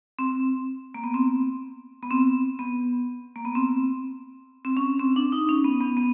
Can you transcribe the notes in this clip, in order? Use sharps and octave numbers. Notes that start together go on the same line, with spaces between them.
C4
A#3
B3
C4
B3
C4
B3
A#3
B3
C4
C4
C#4
C4
D4
D#4
C#4
B3
B3
B3